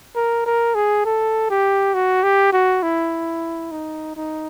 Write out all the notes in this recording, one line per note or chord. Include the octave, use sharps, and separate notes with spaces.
A#4
A#4
G#4
A4
G4
F#4
G4
F#4
E4
D#4
D#4